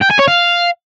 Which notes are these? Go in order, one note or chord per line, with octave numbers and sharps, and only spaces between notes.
G5
G#5
C#5
F5